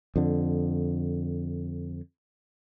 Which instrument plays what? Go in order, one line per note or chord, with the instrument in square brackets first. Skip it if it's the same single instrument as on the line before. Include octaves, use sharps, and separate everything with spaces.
[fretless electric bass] F2 D3